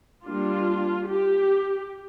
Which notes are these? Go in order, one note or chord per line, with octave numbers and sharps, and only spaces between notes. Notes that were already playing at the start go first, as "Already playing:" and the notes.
G3 A#3 D4 F4
G4